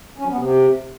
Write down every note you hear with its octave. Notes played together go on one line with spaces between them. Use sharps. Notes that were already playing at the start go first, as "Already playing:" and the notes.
C#4
F#3
B3
C3